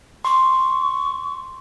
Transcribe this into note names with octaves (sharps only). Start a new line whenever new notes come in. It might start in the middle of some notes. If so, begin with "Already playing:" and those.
C6 C#6